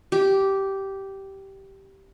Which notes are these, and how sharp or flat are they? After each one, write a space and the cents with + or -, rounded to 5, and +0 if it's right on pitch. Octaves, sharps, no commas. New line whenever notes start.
G4 -10